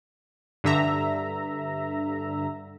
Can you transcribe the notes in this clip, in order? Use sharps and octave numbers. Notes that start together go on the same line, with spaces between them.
G2 D3 E5 A#5